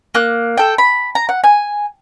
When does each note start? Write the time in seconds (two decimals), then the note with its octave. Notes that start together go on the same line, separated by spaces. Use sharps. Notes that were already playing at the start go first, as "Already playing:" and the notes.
0.14 A#3 F#6
0.57 A4 G5
0.78 B5
1.15 A#5
1.29 F#5
1.44 G#5